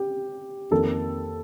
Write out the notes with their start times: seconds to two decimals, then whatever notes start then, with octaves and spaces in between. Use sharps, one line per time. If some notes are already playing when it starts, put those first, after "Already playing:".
Already playing: G4
0.71 F2 D#3 A#3 A4